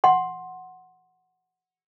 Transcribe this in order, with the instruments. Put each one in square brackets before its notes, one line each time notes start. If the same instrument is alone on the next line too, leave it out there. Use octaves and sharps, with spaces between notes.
[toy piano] F#5 C6